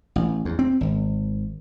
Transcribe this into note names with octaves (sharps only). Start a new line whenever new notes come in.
A1
E2
C4
G#1